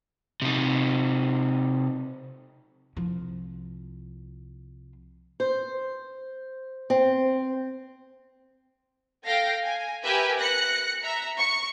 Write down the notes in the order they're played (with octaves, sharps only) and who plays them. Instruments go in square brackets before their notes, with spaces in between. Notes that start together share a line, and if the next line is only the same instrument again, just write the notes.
[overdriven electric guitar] C3 D#4
[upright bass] C2 F3
[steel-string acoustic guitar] C5
C4
[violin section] A4 F5 G5 A#6
G#5
G4 A#4 B4 E5 G#5
F#6 A#6 C#7
E5 A#5
C#6